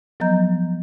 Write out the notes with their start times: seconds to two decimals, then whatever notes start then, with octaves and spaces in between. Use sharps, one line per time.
0.20 F3 F#3 B3 D#5 A#5 G6